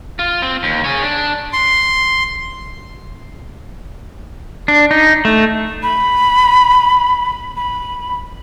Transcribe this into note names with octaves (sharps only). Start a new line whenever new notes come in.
F4
C4
D#2
G#4 C#5
D4
C6
D4
D#4
A3
B5
B5